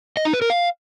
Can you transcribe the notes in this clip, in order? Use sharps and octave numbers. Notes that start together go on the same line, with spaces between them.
D#5
D#4
B4
A#4
F5